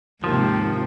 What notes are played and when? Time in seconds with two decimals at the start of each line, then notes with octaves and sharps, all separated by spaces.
0.24 D#2 G#2 C3 F3